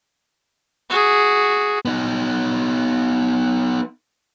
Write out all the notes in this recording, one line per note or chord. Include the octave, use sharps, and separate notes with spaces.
F#4 G#4
B3 D#4